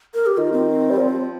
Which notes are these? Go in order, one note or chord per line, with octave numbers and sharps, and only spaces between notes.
A#4
G4
D#3 F4
C4
G3
F3